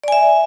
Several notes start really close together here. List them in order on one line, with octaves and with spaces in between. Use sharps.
D5 G#5 E5